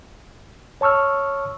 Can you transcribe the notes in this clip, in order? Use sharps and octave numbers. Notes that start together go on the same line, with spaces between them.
C#5 A5 C#6 E6 F6